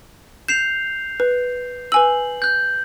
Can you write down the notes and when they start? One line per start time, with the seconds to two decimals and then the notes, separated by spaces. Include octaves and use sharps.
0.48 G6 C7 E7 F7
1.20 B4
1.92 B4 G#5 E6 F#7
2.42 F#6 G6